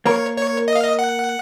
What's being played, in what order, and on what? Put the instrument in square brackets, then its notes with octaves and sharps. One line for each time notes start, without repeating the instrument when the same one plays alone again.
[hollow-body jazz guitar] A#3 A#4 [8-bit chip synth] C#5
[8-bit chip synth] C#5
D#5
F5
D#5
F#5